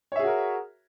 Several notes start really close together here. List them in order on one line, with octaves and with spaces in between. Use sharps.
C#5 E5 G#4 F#4 A#4